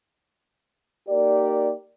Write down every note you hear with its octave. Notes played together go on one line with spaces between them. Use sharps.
A#3 D#4 G4 A#4 D5